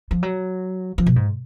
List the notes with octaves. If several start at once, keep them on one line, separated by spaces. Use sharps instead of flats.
F3
F#3
F3
B2
G#2